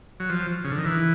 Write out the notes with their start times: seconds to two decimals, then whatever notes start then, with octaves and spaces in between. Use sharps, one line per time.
0.20 F#3
0.30 F3
0.64 C#3
0.72 D3
0.78 D#3
0.86 E3